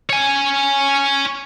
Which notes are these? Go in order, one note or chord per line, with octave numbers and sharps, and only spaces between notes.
C#5 G#5